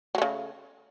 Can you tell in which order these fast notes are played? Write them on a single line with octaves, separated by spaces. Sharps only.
F#3 A3 C#3